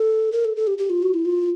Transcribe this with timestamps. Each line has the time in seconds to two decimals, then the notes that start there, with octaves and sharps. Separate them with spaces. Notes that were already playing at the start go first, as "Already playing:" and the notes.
Already playing: A4
0.32 A#4
0.45 A4
0.56 A4
0.67 G4
0.78 G4
0.90 F4
1.02 F#4
1.14 E4
1.25 F4